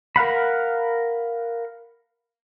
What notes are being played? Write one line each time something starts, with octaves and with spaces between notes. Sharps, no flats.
A#4 F5 F#5 B5